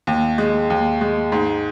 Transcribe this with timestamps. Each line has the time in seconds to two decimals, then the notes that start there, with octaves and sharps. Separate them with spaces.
0.07 D#2
0.38 G#3
0.70 D#2
1.01 G#3
1.32 G#2